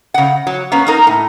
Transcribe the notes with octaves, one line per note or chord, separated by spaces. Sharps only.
C#3 F#5
F#3
A#3 B3 C#4
A#3 D#4 A#4
A2